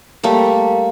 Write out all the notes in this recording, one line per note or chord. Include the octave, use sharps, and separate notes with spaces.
G3 A3 A#3